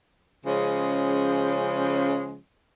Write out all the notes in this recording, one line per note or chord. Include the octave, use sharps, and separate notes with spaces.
C#3 F3 G#3 C#4